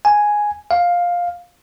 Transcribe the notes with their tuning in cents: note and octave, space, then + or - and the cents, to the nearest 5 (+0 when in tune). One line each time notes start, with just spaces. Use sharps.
G#5 +0
F5 +10